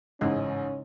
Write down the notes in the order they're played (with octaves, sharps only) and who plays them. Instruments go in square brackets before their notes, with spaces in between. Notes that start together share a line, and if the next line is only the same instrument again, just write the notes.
[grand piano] A1 G#2 [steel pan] C#3 G#3 D#4 [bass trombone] C#4